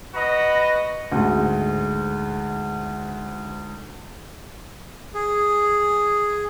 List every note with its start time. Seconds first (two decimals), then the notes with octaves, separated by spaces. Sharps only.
0.14 F#4 B4 D#5 A#5
1.12 D2 G#2
5.14 G#4